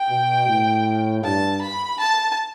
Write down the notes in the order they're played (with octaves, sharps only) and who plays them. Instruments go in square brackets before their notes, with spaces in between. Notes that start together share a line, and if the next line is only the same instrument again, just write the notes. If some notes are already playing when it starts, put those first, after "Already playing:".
Already playing: [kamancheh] G5
[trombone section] B2
A2
[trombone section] G2 [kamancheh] A5
[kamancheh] B5
A5